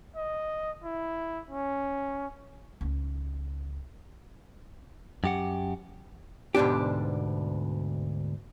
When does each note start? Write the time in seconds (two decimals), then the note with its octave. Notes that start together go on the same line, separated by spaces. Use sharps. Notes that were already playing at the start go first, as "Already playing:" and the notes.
0.16 D#5
0.83 E4
1.50 C#4
2.81 C#2 D#4
5.24 F#2 G4 F#5
6.55 D2 G#2 B2 D4 G4